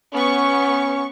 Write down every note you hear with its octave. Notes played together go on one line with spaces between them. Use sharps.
B3 C#4 C#6